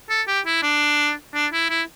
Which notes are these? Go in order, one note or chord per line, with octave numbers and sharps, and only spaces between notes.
A4
G4
E4
D4
D4
E4
E4